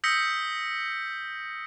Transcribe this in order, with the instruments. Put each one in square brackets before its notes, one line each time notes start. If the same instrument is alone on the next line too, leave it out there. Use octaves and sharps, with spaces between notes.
[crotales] D#6 E6 G6 A#6 B6 C#7